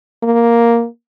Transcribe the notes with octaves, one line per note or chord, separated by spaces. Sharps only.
A#3